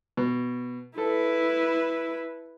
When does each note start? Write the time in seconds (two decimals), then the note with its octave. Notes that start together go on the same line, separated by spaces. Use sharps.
0.17 B2
0.98 E4 A4 B4